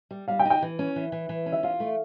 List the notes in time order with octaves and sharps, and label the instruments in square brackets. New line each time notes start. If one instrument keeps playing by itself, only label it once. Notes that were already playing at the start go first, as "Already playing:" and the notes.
[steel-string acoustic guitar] G3
[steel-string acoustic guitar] G3 [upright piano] F5
[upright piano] G5
[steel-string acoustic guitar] D#4
[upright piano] G5
[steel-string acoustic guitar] E3
C#4
E3
E3
E3
C#4
[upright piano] E5
[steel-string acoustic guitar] F4 [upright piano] F5
[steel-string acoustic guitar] A3